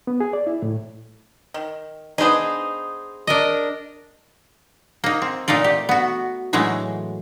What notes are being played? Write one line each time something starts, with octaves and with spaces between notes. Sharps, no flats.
B3
G#4
D5
E4
A2
D#3
B3 D4 D#4 G#4 C5
D4 A#4 D#5
A#3 D#4
C4
A#2 A3 D#4 F4 D5
G4
B3 F#4
A2 E3 F#3 G#3 A3